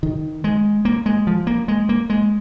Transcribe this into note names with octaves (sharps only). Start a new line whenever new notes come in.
D#3
G#3
A#3
G#3
F3
A#3
G#3
A#3
G#3